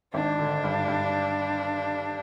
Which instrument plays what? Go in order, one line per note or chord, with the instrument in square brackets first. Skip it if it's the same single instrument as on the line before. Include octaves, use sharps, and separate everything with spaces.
[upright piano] G#1 [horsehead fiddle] D4
[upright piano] D3
G2
G2